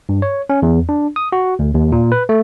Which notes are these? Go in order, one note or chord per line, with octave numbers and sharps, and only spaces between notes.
G2
C#5
C#4
E2
D4
D#6
F#4
D2
D#2
A#2
B4
A3